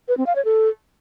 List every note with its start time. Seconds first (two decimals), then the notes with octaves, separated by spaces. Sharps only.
0.08 B4
0.17 C4
0.26 F5
0.35 C#5
0.45 A4